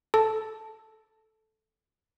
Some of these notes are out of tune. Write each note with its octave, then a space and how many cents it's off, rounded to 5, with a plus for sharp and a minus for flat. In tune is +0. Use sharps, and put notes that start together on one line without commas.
A4 -10 A5 +0